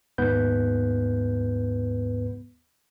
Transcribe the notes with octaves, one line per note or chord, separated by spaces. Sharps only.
D#2 G#2 B3 B4 G6